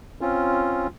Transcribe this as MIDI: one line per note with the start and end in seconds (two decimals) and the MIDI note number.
0.21 0.87 60
0.21 0.87 61
0.21 0.87 65